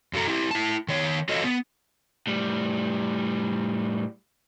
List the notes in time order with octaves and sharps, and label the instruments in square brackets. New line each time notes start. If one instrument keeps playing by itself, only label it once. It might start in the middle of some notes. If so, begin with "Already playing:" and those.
[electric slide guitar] F#2 F#4 A4 A#5
E4 G4
E4 A5
D#3 C#5
F4 F#4 A4 C#5 D#5
B3
[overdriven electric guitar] A2 G3